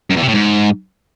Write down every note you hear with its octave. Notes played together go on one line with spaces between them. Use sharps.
F#2
E2
C3
A2
G#2